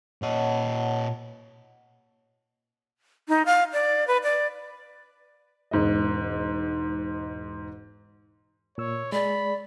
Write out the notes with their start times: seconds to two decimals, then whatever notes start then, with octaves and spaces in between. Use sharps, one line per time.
0.22 A#2 C#5 D#5 F#5 A5
3.29 D#4
3.46 F5
3.73 D5
4.07 B4
4.23 D5
5.71 E1 G#2 D#4 D#5
8.78 A#2 C#5 E6
9.12 G#3 G#4 D5 B5